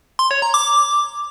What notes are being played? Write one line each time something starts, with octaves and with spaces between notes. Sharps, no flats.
C6
C#5
A#5
D6